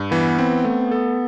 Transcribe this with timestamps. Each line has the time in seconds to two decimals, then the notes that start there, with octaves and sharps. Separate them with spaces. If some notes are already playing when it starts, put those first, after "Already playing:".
Already playing: G2
0.11 E3 B3
0.38 C4
0.64 A3
0.91 A4